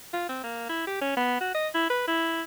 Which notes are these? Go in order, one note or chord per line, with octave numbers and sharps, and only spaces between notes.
F4
C4
A#3
E4
G4
C#4
B3
F#4
D#5
E4
B4
E4